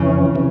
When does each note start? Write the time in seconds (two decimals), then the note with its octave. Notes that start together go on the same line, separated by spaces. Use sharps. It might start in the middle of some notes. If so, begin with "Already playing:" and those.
Already playing: F2 C#3 E3 C#4
0.35 C3 E3